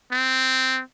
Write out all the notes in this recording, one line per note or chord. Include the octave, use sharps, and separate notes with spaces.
C4